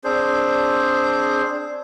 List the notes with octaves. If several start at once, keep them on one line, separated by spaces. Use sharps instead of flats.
C4 D4 G#4 C5